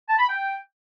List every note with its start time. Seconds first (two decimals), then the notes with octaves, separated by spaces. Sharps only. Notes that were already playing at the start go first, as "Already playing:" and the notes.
0.09 A5
0.19 B5
0.29 G5